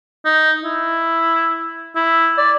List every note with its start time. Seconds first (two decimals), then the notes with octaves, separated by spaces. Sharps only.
0.25 D#4
0.64 E4
1.96 E4
2.38 D5